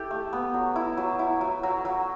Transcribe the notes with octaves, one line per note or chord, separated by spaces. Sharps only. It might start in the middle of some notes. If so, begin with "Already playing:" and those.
Already playing: E4 G4 A4
A3
B3
F#3
E4
F#3
E4
F#3
F#3
F#3